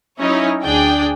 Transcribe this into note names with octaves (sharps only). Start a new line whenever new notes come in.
F#3 C#4 D#4 E4 C#5 D#5
D2 D4 G#4 D5 G5